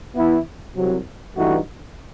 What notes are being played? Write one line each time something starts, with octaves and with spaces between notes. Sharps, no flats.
E3 B3 E4
C2 C3 F#3
G2 E3 A3 D#4 F#4